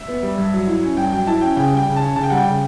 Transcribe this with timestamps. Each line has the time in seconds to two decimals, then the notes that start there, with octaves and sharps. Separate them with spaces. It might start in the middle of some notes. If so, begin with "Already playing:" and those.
Already playing: E5
0.08 B3
0.22 G3
0.38 G2
0.53 F#3
0.67 E4
0.82 C#4
0.97 G2 G5
1.12 F#3 G5
1.27 E4 A5
1.41 C#4 G5
1.56 C#3 G5
1.72 G3 G5
1.87 C#3
1.96 C#4 A5
2.16 C#3 A5
2.23 G5
2.30 G3 F#5
2.37 G5
2.46 C#3